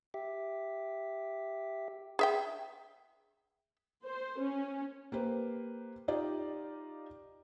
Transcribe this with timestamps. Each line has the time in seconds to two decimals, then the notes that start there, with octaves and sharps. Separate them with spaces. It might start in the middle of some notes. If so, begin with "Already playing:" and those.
0.14 G4 E5
2.19 G#4 E5 G5
4.05 C5
4.39 C#4
5.12 A#3 G4 B4 C5
6.08 D#4 F4 G4 D5 D#5